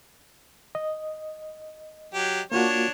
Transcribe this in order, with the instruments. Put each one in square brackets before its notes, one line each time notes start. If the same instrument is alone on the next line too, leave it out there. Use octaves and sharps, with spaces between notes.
[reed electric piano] D#5
[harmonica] F#3 G4
[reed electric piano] A#3 F4 F#4 [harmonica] D4 C#5